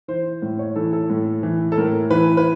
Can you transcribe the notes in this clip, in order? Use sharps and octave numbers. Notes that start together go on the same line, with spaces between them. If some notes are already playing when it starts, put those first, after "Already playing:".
E3 C5
A2
C#5
E3 A4
A4
A2
E3
A4
A2 A#4
E3 B4
B4